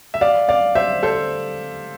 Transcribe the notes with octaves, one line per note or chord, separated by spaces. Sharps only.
E5
D5 F5
D5 F5
C5 E5
A4 C5